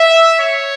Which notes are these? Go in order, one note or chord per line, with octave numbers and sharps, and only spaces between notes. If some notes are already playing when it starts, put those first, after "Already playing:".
Already playing: E5
C#5